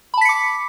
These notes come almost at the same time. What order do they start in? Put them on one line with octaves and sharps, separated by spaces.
B5 A5 B6 C#7 D6